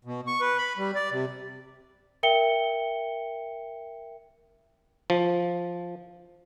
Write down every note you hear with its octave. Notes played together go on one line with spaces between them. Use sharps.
B2
C#6
B4
B5
G3
D5
C3
A#4 E5 G5 C#7 G7
F3